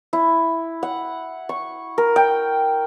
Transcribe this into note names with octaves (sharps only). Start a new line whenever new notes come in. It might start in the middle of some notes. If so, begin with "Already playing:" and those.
E4
F#5
C#6
A#4
G5